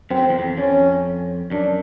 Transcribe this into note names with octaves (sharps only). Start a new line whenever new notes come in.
F#2 C4
F2
E2
F2
F2 C#4
F#2 D4